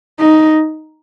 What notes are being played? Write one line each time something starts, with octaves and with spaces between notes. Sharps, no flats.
D#4